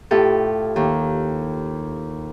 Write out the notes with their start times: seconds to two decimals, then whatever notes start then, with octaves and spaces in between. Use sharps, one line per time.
0.11 A2 E4 F4 G4 A4
0.76 D#2